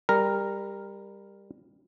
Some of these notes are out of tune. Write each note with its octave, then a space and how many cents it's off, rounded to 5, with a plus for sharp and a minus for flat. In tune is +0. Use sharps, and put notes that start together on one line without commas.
G3 +20 A#4 +0